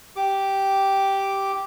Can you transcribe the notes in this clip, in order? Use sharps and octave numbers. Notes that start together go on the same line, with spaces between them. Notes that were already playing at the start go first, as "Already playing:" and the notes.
G4 D6